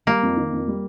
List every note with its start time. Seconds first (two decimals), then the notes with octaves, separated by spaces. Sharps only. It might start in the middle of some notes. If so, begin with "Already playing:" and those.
0.07 G3 A#3
0.23 F2
0.37 D#3
0.52 F2
0.68 G3